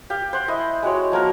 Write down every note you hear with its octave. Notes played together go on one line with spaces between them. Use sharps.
G4 F5
C5 F#5
E4 D#5 G#5
G#3 F#4 G4 C#5
F3 A#3 F#4 A#4